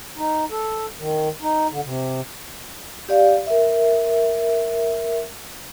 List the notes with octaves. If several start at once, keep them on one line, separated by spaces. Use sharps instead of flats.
D#4
A4
D#3
D#4
D3
C3
G4 D5 F5
A#4 E5